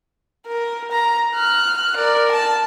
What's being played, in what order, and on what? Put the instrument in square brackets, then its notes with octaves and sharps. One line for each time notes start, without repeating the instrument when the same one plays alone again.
[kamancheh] A#4
A#5
F6 F#6
A#4 D5
A5